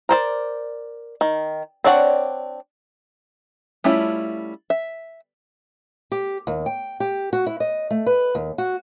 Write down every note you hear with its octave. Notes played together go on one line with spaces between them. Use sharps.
A#4 C5 D5
D#3
C4 D4 C#5 D5 F#5
G3 A3 C#4 E4 F4
E5
G4
D#2
G5
G4
F#4
E4
D#5
A3
B4
D#2
F#4